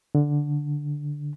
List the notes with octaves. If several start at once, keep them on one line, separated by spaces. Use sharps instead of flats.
D3